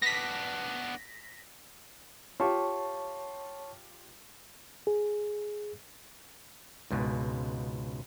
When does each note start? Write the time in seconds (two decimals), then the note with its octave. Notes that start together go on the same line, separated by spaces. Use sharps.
0.02 B3 D4 A#6 B6
2.40 F4 G4 C#5 A5 C#6
4.87 G#4
6.91 C#2 G#2 B2